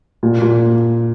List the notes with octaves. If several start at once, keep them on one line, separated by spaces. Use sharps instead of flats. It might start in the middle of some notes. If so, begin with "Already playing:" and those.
A#2
A#2